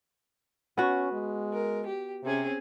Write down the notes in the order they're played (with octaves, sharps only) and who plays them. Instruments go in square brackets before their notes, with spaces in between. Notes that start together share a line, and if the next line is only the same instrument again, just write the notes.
[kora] B3 F#4 [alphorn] C#4
[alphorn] G#3
[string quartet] A#4
G4
[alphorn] C3 [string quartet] C4 C#4 G#4